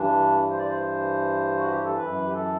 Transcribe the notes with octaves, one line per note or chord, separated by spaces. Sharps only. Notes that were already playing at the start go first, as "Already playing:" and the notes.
Already playing: G2 E3 D4
C5
D5
C5
F#4
G4
A4
F#2 E3 B4
G4
A4